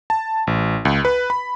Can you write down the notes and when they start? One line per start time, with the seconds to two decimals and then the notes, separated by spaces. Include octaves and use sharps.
0.10 A5
0.47 A1
0.85 C#2
1.05 B4
1.30 B5